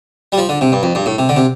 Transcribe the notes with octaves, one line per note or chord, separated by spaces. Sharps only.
G3
F3
D3
C3
G2
F2
G2
A2
C3
D3
C3